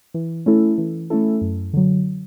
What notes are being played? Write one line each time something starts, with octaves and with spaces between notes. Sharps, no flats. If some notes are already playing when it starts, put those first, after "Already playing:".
E3
A3 C#4 E4 A4
E3
A3 C#4 E4 A4
F#2
D3 F#3